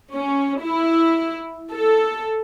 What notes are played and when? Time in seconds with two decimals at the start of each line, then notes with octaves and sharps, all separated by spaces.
0.14 C#4
0.61 E4
1.72 A4